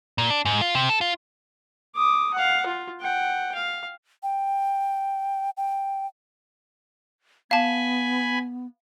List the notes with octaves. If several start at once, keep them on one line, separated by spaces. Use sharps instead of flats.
A#2
D4
G#2
F4
C3
A4
F4
D6 D#6
F5 F#5
F4
F#5 G5
F5
G5
G5
B3 F5 G#5 A5 B5